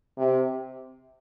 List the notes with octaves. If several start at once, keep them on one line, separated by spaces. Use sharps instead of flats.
C3